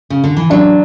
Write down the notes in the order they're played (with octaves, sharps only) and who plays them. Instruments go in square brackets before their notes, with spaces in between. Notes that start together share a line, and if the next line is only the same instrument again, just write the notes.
[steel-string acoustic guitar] C#3
D3
E3
[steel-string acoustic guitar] F#3 [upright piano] D4